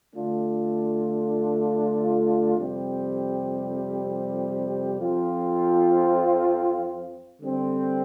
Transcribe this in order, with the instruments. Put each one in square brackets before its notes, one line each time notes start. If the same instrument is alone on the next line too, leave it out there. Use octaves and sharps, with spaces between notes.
[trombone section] D3 A3 D4 F4
F2 C3 G3 C4 G4
F2 F3 C4 F4
D3 G3 C4